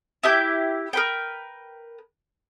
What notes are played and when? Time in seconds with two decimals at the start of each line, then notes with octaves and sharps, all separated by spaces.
0.23 E4 G4 G6
0.93 A#4 B4 G5